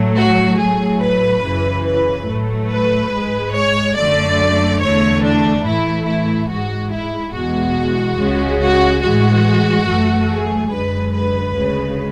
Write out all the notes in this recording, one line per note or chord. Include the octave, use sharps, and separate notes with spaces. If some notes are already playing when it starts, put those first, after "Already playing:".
Already playing: A2 F#3 A3
F#4
A2 F#3 A3 G#4
B4
F#2 C#3 E3
B4
A2 F#3 A3
B4
G#2 G#3
C#5
F#2 D3 A3 D5
E2 D3 A3 C#5
D4
A2 E3 A3 E4
E4
G#2 G#3 F#4
E4
E2 B2 G#3 F#4
C#2 C#3 G#3
F#4
A2 E3 G#3 F#4
F#2 E3 A3
G#4
F#2 D3 G#3 B4
B4
D2 C#3 G#3